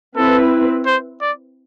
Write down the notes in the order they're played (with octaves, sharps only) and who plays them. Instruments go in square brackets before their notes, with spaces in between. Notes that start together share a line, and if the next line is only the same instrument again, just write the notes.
[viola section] C4 E4 B4 [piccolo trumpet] A4
[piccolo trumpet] C5
D5